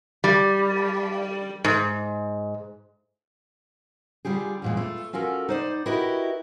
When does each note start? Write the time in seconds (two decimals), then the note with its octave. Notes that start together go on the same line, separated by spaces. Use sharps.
0.24 G3
1.64 G#2
4.25 D3 G3 F4 G4 G#4
4.62 E2 G2 A#2 E3 G#3
4.77 A3 F4
5.13 C#4 F4 F#4 A4 A#4
5.49 D#4 C5 D5
5.86 E4 F#4 G4 A#4 B4 D#5